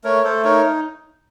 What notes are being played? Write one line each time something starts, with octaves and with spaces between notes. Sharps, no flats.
A3 A#4 C#5
A3 A4 C5
D#4 A#4 C#5